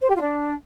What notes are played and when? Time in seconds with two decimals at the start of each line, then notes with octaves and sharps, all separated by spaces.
0.01 C5
0.08 G4
0.14 F4
0.21 D4